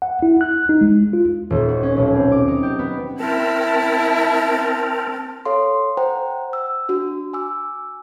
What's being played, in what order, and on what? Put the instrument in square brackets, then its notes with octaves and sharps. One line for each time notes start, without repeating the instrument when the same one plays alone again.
[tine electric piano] F#5
E4
F#6
D#4
G#3
F4
[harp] D#1
F#4
C#4
B1
C4
D6
D#4
G4
B3
[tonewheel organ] C4 A#4 [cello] E4 [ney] A5
[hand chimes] A4 C#5 F5 C6
C5 F#5 G5 A#5
E6
D4 F#4
G#5 D6 E6